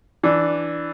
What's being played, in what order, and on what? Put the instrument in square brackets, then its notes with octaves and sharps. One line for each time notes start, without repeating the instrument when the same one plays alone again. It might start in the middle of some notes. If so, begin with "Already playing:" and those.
[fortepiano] E3 D4